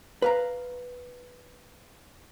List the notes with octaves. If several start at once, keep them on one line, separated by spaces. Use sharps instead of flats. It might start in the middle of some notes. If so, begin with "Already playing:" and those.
B4 F5 A#5